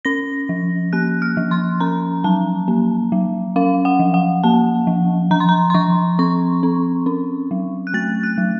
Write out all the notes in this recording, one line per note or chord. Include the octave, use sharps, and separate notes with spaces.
C#4 A#6
F3
A#3 F#6
F6
F3
C6
C#4 A#5
F#3 A5
A#3
F#3
C#4 F5
F#5
F3
F#5
A#3 A5
F3
F3 A#5
C6
A#5
C6
F3 C#6
C4 C#6
C4
C#4
F#3
F#6
A3 A6
F#6
F#3